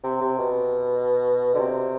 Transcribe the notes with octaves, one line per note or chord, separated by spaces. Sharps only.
C3
C3
B2
D3
C3